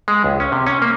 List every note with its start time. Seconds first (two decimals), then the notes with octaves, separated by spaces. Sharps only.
0.08 G#3
0.24 C#2
0.40 C#4
0.52 C3
0.67 C#4
0.82 A#3